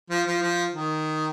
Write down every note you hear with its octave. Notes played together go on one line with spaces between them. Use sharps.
F3
F3
F3
D#3